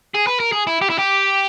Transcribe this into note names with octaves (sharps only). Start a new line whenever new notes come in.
G#4
B4
A#4
G#4
E4
G4
E4
G4